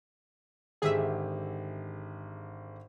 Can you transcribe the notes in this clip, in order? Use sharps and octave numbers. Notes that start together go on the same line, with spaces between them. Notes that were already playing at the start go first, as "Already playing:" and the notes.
G#1 D3 G4 G#4 E5